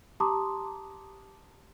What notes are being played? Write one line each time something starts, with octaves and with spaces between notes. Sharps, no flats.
G4 A5 A#5 C6 D6 D#6